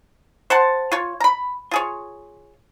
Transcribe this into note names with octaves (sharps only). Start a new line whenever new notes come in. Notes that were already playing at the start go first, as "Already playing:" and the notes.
C5 F#5 A5
F4 C#5
A#5 B5
F4 G#4 C#5